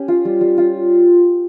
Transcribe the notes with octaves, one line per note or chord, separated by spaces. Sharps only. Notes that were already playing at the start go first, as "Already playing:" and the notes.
Already playing: C#4 G4
F4
G3
G3
F4